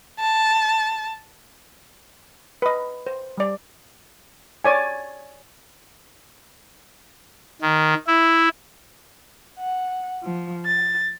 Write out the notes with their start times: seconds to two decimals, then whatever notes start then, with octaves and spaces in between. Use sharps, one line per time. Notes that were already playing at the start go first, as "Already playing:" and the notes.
0.20 A5
2.62 B4 D#5
3.07 C5
3.38 G3 D5
4.64 C#5 D5 G#5
7.61 D#3
8.07 E4
9.58 F#5
10.23 F3
10.66 A6